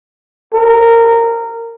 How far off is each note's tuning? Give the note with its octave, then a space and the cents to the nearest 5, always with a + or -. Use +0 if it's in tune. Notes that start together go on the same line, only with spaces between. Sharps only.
A#4 -15